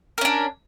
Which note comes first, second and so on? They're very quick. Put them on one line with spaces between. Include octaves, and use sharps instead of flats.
A#4 C#4 D4